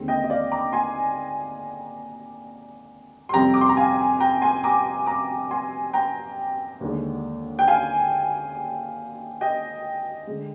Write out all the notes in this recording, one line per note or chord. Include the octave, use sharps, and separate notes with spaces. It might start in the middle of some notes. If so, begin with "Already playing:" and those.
Already playing: D#2 D3 G#3 C4
D#5 G5
D#5
D5 F5
A#5 D6
G#5 C6
C6
F2 C3 G3 G5 A#5
D6
C6
A#5
F5 G#5
G5 A#5
G#5 C6
A#5 D6
A#5 D6
G#5 C6
G5 A#5
D#2 D3 G#3
G5
F5 G#5
D#5 G5
D3 G#3